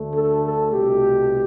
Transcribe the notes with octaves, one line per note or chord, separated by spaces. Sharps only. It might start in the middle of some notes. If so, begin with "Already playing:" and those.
Already playing: D2 D3 A3
A4
A4
C2 B2 A3 G4